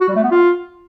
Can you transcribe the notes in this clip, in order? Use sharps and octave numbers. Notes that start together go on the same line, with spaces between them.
F#4
G3
A3
B3
F4